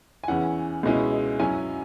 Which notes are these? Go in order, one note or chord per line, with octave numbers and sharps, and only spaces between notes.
G#5
E2 E3 C#4 E4 F#5
C#2 B2 G#3 C#4 E4
F#2 F#3 C#4 E4 G#5